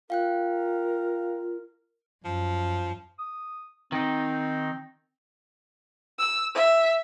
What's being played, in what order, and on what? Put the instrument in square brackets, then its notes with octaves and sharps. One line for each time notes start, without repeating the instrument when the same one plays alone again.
[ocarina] F4 [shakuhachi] A#4 [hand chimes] F5 G5 F#6
[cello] F#2 [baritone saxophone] F3
[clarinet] D#6
[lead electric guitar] D#3 D#4 [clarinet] C4
[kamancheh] E6
E5